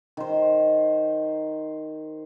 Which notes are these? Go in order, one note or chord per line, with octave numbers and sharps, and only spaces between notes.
D#3 C5